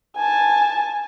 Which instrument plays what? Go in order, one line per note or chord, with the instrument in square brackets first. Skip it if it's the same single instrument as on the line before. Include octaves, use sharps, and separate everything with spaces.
[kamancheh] G#5 A5